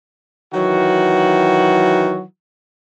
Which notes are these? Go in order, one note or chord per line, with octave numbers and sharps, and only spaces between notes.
D#3 E3 F#3 F#4